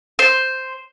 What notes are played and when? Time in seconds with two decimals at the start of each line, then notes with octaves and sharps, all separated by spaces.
0.19 C5